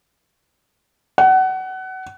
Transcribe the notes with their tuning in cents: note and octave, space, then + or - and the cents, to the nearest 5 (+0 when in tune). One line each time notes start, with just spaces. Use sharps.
F#5 +25